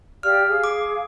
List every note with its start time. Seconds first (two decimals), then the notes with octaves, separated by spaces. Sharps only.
0.23 G4 D5 F5 F6
0.49 G#4 F5
0.64 D6